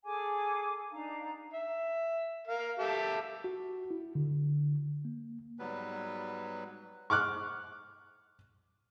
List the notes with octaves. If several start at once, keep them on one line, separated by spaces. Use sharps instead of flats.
G#4 A4 G#5 D6
D4 D#4 F5 A#5
E5
A#4 F5
G4 A4 E5
F#4
E4
D3
A#3
G#2 F#3 G3 B3 B4
C#6 D6 F6 F#6